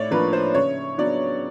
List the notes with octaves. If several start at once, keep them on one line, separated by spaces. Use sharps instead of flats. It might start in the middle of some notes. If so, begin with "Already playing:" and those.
Already playing: A2 C#5 D5
F3 A#3 D4 B4
C5
C#3 C#5
F#3 B3 D4 D5